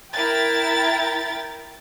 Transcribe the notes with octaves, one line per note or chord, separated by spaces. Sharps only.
E4 A#4 G5 A6